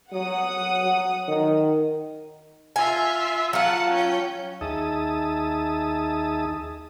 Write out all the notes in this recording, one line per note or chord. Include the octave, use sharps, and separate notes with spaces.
F#3 F#5 D#6
F#3
D#3
F4 E5 G#5
F#3 F4 F#5 A5
C#4 G5
D#2 D#4 G#4 E5 A5 D#6